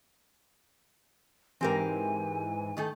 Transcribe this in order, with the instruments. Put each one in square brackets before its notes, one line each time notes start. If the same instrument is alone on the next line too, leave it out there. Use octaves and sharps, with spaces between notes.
[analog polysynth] G#2 E3 [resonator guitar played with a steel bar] C4 G4 A#4 [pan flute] G#5
[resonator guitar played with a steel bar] D#3 A3 A4